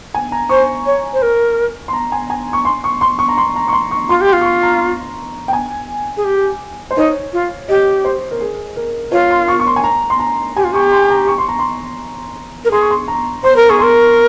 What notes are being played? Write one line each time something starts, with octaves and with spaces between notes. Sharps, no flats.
G#5
A#5
C5 C#6
C#5
C5
A#4
C6
A#5
G#5
G#5
C#6
C6
C#6
C6
C#6
A#5
C6
A#5
C#6
C6
C#6
F4 C6
G4
C6
F4
C#6
C6
A#5
G5
G#5
G#4
G4
C5
D#4 C#5
F4
G4 D#5
C5
A#4
G#4
A#4
F4 C#5
C6
C#6
C#6
C6
G#5
A#5
C6
A#5
G4 G#5
F4
G4 C#6
C6
A#5
C#6
C6
A#5
C6
A#4
G#4 C6
C#6
C6
A#5
C5 C6
A#4
G#4 C#6
A#4 C6